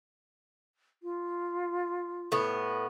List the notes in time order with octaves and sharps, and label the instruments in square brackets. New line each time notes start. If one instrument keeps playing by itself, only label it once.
[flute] F4
[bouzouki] A2 B3